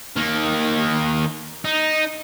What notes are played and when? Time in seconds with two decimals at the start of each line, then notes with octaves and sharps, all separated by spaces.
0.16 D#3 A#3
1.65 D#4